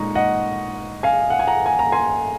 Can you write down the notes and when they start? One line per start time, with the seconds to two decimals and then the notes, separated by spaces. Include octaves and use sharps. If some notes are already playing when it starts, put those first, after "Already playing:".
Already playing: A#2 G#3 D#4 A#5 C#6
0.15 D#5 F#5
1.03 F5 G#5
1.30 F#5
1.39 G#5
1.47 F#5 A#5
1.66 G#5
1.79 A#5
1.92 G#5 C6